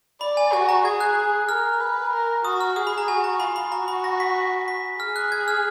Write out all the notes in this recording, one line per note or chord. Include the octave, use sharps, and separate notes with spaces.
D5 B5
G#5
F#4 G#5
A#5
G#4 G#6
F#6
A#4 F6
B4
A#4
F#4 D#6
F6
G#4 D#6
B5
A#5
F#4 G#5
A#5
F4 B5
B5
F#4 A#5
B5
A#6
B6
B6
G#4 F6
F#6
G#6
F6